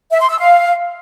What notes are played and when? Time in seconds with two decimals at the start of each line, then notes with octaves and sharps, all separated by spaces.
0.11 E5
0.21 C6
0.30 E6
0.39 F5